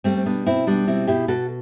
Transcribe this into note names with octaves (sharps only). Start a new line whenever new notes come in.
G3 A3 C4
C4
B2 B3 D4
B2 C4 E4
G3 B3 D4
B2 C4 E4
B2 E4 G4
B2 F#4 A4